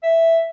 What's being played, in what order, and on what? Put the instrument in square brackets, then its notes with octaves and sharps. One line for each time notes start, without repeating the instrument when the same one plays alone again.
[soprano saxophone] E5